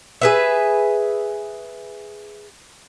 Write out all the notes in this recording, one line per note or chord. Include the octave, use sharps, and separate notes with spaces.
G#4 B4 E5